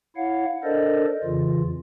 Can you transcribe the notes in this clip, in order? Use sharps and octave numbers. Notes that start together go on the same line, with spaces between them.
E4 C#5 F5 F#5
D4 A4 A#4 C5 D5 D#5
F2 C#3 E3 F4